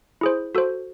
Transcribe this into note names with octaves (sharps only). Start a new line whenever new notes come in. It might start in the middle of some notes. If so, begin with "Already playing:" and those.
E4 G#4 C5
F#4 A4 C5